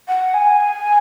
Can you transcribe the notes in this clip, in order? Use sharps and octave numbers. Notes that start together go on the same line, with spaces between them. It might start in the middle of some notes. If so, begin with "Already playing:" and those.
F#5
G#5